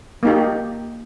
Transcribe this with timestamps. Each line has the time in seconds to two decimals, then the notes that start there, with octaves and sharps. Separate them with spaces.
0.23 A#3 D#4 G4